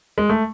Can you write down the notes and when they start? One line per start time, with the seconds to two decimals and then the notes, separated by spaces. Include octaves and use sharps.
0.18 G#3
0.29 A3